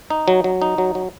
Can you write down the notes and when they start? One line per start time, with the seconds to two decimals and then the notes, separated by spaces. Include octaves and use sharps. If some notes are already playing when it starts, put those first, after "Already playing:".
0.10 D#4
0.28 F#3
0.44 F#3
0.62 D#4
0.78 F#3
0.95 F#3